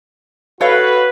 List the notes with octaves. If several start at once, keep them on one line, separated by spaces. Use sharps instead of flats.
F#4 A4 B4 C#5 F5